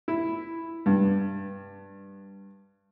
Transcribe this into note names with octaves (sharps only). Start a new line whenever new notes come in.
E4
G2